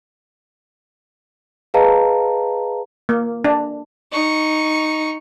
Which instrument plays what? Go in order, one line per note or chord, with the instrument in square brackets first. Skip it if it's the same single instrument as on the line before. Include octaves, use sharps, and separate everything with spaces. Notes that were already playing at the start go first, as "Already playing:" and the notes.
[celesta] G#4 B4 D#5 F5 A5 A#5
[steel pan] A#3
D4
[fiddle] D#4 C#6